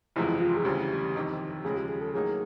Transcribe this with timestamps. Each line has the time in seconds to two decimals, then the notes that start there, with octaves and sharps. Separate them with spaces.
0.16 F#1 E2 C3 F3 G#3 E4
0.41 F4
0.57 G#4
0.65 D2 C#3 E3 G3 G4
1.15 F2 C3 D#3
1.64 D#2 C#3 F3 G#3 G#4
1.76 G4
1.89 G#4
2.01 A4
2.14 A2 F#3 A#3 D#4 G#4